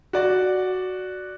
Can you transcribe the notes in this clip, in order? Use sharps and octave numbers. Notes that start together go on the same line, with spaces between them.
F#4 D5